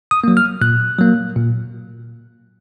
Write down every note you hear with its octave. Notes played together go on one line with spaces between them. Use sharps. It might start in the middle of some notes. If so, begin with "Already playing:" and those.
D#6
F#3 A#3
F6
A#2 F#6
F#3 A#3
A#2